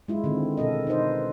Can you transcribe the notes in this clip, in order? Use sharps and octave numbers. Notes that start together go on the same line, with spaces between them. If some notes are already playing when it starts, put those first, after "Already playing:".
G#3 E4 F4
D3 D#3 C4
B2 A4 A#4 D#5
D#4 E4 B4 C5 D#5